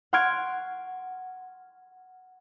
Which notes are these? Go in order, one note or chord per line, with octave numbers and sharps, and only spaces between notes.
F#5 C6 C#6 F6 G#6 D7